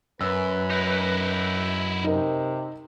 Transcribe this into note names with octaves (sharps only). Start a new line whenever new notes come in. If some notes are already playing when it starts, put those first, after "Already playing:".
F#2 B4 E6
D#4 E4
C3 D#4 A#4